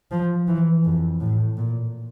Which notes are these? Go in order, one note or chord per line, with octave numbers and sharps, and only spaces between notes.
F3
E3
F2
A2
A#2